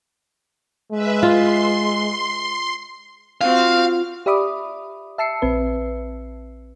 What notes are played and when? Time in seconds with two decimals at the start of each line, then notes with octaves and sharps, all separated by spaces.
0.91 G#3 B4 E5
1.23 F4 C6
3.41 C4 F4 F#4 F5
4.26 G4 D5 E5 B5 D6 D#6
5.18 E5 A5 E6 C7 C#7
5.42 A#1 C4 B4